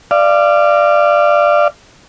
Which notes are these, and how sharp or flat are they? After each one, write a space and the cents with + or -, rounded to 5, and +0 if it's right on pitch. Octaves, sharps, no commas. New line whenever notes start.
D5 +15 F5 -25